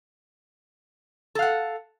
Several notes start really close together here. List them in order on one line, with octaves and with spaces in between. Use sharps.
A4 F5 F#5